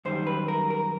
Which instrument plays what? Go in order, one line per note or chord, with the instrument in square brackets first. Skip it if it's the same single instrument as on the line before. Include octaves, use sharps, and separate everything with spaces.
[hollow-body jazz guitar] F#2 D#3 G3 C5
B4
A#4
A#4